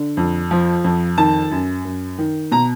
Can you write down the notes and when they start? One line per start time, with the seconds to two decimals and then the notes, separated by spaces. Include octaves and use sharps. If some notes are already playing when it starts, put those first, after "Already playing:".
Already playing: D3
0.17 F2
0.51 F3
0.84 F2
1.18 D#3 A5
1.51 F#2
1.85 F#2
2.18 D#3
2.51 B2 A#5